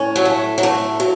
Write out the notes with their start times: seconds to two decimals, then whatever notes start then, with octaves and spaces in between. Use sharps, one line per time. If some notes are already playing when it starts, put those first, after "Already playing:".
Already playing: A2 C#4
0.16 F#3
0.25 A3
0.58 F#3
0.63 A3
1.00 F#3